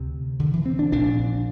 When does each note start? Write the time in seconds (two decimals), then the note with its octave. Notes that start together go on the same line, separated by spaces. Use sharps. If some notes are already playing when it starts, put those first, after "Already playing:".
Already playing: D2 C3
0.40 D3
0.53 E3
0.66 C4
0.79 D4
0.92 A#1 A#2 D4